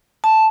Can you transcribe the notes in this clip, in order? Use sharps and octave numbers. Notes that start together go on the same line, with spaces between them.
A5